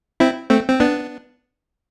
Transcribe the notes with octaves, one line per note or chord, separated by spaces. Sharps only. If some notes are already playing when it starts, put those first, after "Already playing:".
C4 E4
A3 C4
C4
B3 D4